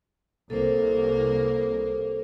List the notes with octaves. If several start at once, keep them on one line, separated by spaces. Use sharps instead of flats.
C2 A#3 A4 C5